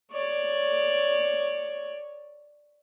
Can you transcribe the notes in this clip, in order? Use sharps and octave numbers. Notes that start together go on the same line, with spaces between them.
C#5 D5